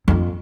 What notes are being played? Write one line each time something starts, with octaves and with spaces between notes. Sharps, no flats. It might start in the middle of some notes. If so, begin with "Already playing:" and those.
F2